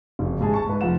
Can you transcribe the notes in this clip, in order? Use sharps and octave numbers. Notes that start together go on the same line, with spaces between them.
F#1 F2
D#1 G#2 G#4 A5
A5 C#6
G#2 B4
F1 F3 D#4 F#5 E7